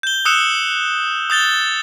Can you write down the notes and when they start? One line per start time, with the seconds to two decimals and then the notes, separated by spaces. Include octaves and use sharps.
0.03 G6 G7
0.25 D#6 E6 F#6 C#7 E7
1.30 D#6 G6 A6 G7